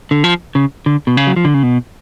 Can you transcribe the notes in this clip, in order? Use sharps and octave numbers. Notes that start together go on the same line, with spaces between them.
D3
F3
C#3
D3
B2
C#3
F#3
F3
D3
C#3
B2